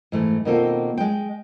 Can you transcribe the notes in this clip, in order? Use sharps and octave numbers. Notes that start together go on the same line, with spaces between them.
G#2 E3 A3
B2 D#3 A#3 C4 F4 A4
G#3 G5